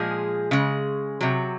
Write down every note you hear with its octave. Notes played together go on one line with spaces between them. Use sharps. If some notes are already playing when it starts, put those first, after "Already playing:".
Already playing: A#2 F3 G#3 G#4
C#3 G#3
C3 F#3